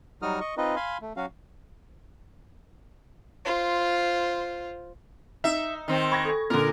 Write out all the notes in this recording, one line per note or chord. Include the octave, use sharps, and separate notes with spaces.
F#3 G3 D#4 F#4 D#6 F6
D#5 C#6
C4 D#4 F4 B4 D#5
F5 G#5 B5 C6
A3
F#3 C#4 F#4 F5
F4 C5
D#4 E5
D#3 C4
C5 G5 B5 C#6 G#6 A#6
A4 G#5
A#2 D3 C#4 A4 A#4